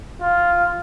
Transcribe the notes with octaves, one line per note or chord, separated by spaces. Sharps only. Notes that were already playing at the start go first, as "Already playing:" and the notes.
F4